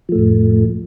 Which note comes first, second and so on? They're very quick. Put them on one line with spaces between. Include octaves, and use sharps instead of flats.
F3 A3 A2 F2